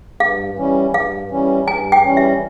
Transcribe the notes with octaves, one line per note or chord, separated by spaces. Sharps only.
G2 F5
E3 G3 C#4
G2 F5
E3 G3 C#4
G2 G#5
G5
E3 G3 C#4
E5